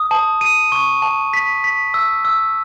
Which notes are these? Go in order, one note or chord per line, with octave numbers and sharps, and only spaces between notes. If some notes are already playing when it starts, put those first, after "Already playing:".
Already playing: D#6
A5
D#7
C#6
A5
B6
B6
E6
E6